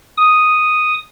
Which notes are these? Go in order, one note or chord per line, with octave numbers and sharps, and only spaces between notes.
D#6